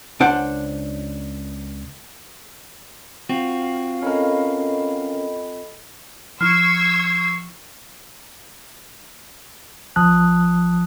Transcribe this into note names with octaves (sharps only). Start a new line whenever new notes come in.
C#2 D4 C5 F#5
C4 F4 F#4 F5
C#4 A4 A#4 D#5 B5
F3 E4 C#6 E6 F6 G#6 C7
A1 F3 A5 D#6 F#6